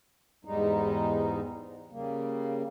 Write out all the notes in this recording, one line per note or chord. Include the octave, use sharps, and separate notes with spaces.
E2 G#2 G3 G#3 D#4
C#3 G3 A#3